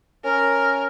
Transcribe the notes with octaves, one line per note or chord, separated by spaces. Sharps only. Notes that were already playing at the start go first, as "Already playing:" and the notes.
C#4 A#4